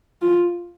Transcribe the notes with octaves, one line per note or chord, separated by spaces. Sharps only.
F4